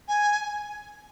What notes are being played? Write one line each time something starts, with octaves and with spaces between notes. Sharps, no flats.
G#5